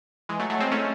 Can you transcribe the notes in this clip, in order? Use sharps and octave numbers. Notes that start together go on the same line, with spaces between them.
E3 G#3
F#3 A3
F#3 A3
G#3 C4
A3 C#4